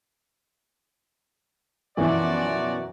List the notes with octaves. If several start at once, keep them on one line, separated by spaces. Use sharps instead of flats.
F#2 B2 E3 F3 F#4 D5